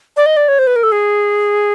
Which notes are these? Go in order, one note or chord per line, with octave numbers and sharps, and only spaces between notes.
D5
D#5
D5
C#5
C5
B4
A#4
A4
G#4